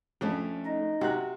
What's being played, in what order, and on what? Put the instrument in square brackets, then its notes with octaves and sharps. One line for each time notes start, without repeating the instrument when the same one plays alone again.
[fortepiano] F2 [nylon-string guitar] A3 C#4 D4
[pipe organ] D#4 D#5
[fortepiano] C3 F#6 [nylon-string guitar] F#4